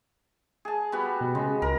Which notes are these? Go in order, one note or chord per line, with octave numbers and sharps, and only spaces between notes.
G#4 A5
G3 B3 F#4
B2
C#3 G#3
C#2 A#4